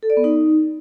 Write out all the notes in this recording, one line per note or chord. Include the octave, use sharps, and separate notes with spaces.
A4
D5
B3
D#4